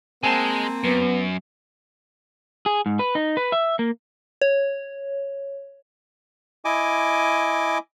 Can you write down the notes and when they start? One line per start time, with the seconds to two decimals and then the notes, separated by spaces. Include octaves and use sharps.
0.23 G#3 A#3 C4 G#5 A5
0.84 F#2 B3
2.66 G#4
2.86 G#2
2.99 B4
3.15 D#4
3.37 B4
3.52 E5
3.79 A#3
4.42 C#5
6.65 E4 D#5 G#5 D6